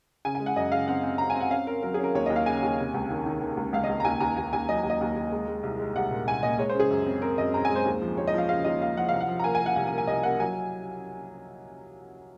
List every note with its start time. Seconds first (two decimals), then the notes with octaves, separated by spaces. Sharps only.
0.25 C#3 G#5
0.35 G#5
0.40 G#3
0.46 F#5
0.56 F#2 D#5
0.72 C#3 F5
0.88 C4 F#5
1.03 C4
1.18 C4 A#5
1.30 G#5
1.35 C4
1.40 F#5
1.51 C#4 F5
1.67 C#4 A#4
1.83 F#3 A#4
1.94 G#4
1.99 C#4 A#4
2.15 D#2 C#5
2.26 D#2 D#5
2.36 F5
2.46 C#3 G#5
2.63 D#2
2.79 C3
2.94 C#2
3.10 D#3
3.26 D#3
3.41 D#3
3.57 C#2
3.73 C#2 F5
3.84 D#5
3.89 C#2
4.00 A#5
4.05 D#2 G#5
4.20 D#2 A#5
4.37 D#2 G#5
4.53 D#2 G#5
4.69 F#3 D#5
4.84 D#2
4.90 D#5
5.01 D#2
5.16 D#2
5.32 G#3
5.48 G#3
5.63 C2
5.79 G#3
5.96 C2 F#5
6.11 A#2
6.27 C2 G#5
6.43 A#2 D#5
6.58 G#3 C#5
6.70 C5
6.75 C#3 G#4
6.90 F#2
7.06 C4
7.22 C4 A#4
7.38 F#2 D#5
7.54 C4 A#5
7.65 G#5
7.70 G#3
7.76 C5
7.85 D#2
8.01 F3
8.17 D#2 C#5
8.27 D#5
8.34 F3 F5
8.49 C#3 F5
8.64 D#2 D#5
8.81 D#2 F5
8.97 F3 F#5
9.09 C2 F5
9.21 F#5
9.28 F3
9.40 A#5
9.44 A#3 G#5
9.55 G#5
9.61 A#3
9.66 F#5
9.76 C2 F#5
9.87 G#5
9.92 A#3
9.98 G#5
10.07 C2 D#5
10.23 A#3 F#5
10.40 F#3 G#5